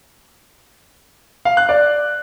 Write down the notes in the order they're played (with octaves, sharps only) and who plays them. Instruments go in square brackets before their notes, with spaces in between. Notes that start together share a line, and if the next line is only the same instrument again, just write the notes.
[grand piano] F5
F#6
D5